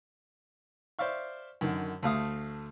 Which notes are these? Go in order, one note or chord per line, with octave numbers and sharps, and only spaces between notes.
C5 D5 E5 F5 C#6
F#2 D3 D#3
D2 A3 F5 D#6